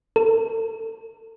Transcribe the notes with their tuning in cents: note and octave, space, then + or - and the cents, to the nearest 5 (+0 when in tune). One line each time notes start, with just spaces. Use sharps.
A4 +35